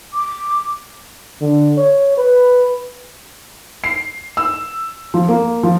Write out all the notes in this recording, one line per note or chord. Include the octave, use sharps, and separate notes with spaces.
D6
D3
C#5
B4
C7
E6
F3
A#3
F3